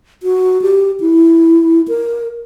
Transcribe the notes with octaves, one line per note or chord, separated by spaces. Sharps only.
F#4
G4
E4
A#4